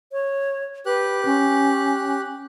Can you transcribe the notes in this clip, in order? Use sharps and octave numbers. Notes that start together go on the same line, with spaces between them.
C#5
G4 B4 F#6
C#4